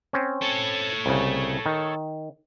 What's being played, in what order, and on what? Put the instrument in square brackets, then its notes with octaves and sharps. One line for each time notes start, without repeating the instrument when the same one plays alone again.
[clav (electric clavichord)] C4 C#4
[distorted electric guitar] A4 C#5
[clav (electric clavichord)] C2 C#3
D#3